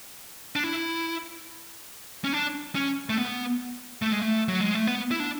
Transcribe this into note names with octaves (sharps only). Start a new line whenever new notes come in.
D4
E4
C#4
D4
C#4
A3
B3
A3
G#3
A3
F#3
G#3
A3
B3
E4
D4